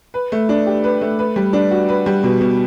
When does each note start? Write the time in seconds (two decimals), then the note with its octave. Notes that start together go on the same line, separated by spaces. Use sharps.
0.14 B4
0.32 A3
0.49 D4
0.66 G4
0.84 B4
1.01 A3
1.19 B4
1.36 G3
1.53 D4
1.71 F#4
1.89 B4
2.06 G3
2.23 B2
2.41 B2